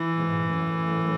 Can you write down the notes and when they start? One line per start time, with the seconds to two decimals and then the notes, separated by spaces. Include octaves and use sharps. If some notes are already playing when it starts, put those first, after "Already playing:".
Already playing: E3
0.15 G#2 B2
0.51 F#2 A2